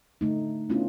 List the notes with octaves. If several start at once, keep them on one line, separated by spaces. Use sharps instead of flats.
D3 A3 D#4
A3 B3 C#4 D4 E4 F4